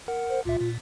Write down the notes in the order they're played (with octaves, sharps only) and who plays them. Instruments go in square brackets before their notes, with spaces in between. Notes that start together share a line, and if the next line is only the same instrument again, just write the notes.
[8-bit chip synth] A#4 F#5
[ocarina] C5
[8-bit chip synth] C#2 A#2 E5 [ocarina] F4
[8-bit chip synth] A#2